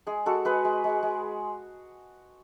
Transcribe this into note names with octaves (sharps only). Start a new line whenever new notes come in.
G#3 G#4
G#3 F#4 A4
G#3 G#4 B4
G#3
G#3
G#3